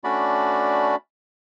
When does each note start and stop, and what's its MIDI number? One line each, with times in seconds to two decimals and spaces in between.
0.04 0.96 57
0.04 0.96 61
0.04 0.96 62
0.04 0.96 66
0.04 0.96 74
0.04 0.96 83